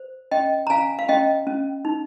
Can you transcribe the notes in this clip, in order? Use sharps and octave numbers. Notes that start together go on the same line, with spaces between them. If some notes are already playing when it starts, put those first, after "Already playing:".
Already playing: C5
C#4 D#5 G5
A#5
C#4 F5 G#5
F5
C#4 D#5 G5
C#4
D#4